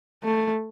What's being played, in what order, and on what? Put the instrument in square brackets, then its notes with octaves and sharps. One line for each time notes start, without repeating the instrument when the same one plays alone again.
[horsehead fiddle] A3